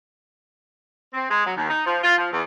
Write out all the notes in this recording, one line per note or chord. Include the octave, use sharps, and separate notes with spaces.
C4
G#3
F#3
D#2
D#4
F3
F4
F3
E2